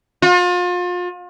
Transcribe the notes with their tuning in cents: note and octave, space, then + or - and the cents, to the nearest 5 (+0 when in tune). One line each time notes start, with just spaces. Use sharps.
F4 +35